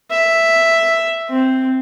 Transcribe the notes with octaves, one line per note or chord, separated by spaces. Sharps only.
E5
C4